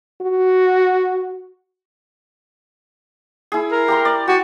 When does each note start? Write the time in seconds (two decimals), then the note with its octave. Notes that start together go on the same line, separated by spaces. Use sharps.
0.22 F#4
3.52 E4 G#4
3.72 A#4
3.88 G4 A#5 C6
4.05 D5
4.28 F#4 G4